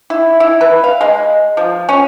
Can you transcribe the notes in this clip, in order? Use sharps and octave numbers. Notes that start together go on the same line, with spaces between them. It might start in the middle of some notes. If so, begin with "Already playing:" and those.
E4
E4
B4
F5
G#3
F3
C#4